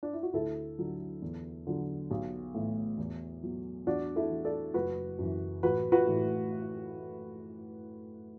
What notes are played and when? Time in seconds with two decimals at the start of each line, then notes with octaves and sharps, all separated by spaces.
0.03 D4
0.13 E4
0.23 F#4
0.33 D2 E4 A4
0.79 D3 F#3
1.22 E2
1.67 D3 F#3
2.11 B1
2.55 A2 E3
2.98 E2
3.43 B2 F#3
3.86 E2 D4 F#4
4.16 E4 A4
4.30 E3
4.45 A4 D5
4.74 F#1 F#4 B4
5.19 F#2 E3
5.62 A1 F#4 B4
5.92 F#4 B4
6.07 A2 E3